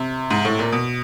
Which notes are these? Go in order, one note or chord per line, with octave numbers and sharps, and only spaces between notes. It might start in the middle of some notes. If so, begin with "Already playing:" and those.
Already playing: C3
G#2
A2
A#2
B2